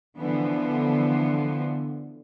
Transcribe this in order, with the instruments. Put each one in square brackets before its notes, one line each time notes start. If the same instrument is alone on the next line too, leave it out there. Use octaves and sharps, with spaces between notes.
[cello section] D3 E3 F3 B3